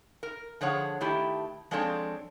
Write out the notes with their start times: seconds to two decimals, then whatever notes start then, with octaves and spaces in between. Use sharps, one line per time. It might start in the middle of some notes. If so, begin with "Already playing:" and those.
0.23 A#4
0.61 D3 F3 G#4 C#5 F#5
1.01 D#3 A3 E4 G4
1.71 F3 G#3 C4 D4 A4 C#5